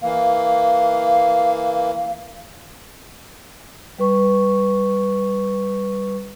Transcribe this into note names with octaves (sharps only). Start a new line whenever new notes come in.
E3 A#3 F5
G3 B4 C#6